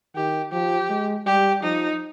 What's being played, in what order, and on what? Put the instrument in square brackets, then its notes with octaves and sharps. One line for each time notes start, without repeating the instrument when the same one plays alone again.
[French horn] D#3 [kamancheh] G4
[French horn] F3 [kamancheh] G4
[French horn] G#3
[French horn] G3 [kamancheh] G4
[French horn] F3 [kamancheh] D#4